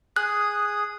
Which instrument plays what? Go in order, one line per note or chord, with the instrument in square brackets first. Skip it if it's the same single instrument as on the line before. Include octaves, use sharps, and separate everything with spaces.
[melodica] G#4 D#6 [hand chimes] F#6